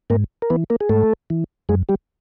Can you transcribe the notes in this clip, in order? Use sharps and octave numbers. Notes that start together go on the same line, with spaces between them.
G#2 A#3 A#4
A#4
E3 B3 B4
A#3 A#4
G#4
G#2 A3 A4
E3
F#2 G#3 G#4
G3 G4